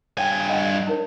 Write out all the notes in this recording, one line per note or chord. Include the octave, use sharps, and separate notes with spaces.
G2 C#5 F5 G5 G#5
D#5 F5 F#5
D#4 A#4 C#5